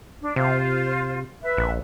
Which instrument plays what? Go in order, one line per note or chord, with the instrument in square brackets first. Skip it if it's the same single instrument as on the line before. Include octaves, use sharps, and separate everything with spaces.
[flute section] D4
[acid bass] C3 [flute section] F4 C5
[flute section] B4 E5
[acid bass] A#1